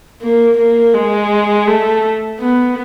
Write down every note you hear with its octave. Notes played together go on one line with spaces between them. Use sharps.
A#3
A#3
G#3
A3
B3